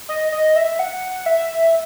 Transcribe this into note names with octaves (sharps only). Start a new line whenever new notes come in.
D#5
D#5
E5
F#5
E5